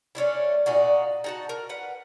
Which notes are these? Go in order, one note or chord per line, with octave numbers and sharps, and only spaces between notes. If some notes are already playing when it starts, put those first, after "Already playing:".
A3 C#4 D4 E4
A#2 D4 D#4 F#4
D#4 F#4 A5
A#4
B4 F#5